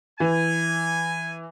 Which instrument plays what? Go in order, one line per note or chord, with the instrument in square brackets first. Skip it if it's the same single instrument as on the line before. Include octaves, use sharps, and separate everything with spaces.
[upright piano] E3 [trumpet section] G#5